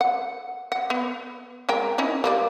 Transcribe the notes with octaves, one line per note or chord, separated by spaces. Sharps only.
F#5
F#5
B3
G#3 A#4 G5
C#4 D#4 E4
G3 A#3 D5